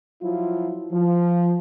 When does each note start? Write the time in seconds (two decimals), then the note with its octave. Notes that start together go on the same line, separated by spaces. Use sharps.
0.22 F3 F#3 E4 F4
0.92 F3